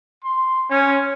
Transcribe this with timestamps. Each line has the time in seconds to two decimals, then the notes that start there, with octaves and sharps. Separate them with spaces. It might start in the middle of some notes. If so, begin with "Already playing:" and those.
0.24 C6
0.70 C#4